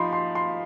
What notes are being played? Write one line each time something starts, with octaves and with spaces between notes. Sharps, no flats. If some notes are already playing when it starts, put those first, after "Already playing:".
Already playing: F3 D#4 B5 C6
C6
C6